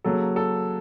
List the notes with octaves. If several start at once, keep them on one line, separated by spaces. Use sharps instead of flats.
C#3 F#3 A#3 A4
A4